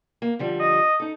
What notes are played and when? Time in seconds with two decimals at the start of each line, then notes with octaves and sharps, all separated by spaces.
0.22 A#3
0.39 D3 F3 G3
0.60 D#5
1.00 D#4 A4